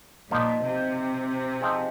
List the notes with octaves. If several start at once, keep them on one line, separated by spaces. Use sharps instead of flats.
A#2 F3 A#3 D#4
C3
F3 C4 D#4 G#4